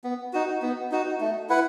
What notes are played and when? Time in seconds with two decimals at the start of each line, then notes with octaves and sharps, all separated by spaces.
0.04 B3
0.33 D#4 F#4
0.62 B3
0.91 D#4 F#4
1.20 A3
1.49 E4 B4 F#5